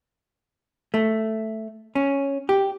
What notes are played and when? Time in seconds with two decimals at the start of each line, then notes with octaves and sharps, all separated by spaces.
0.94 A3
1.95 C#4
2.49 G4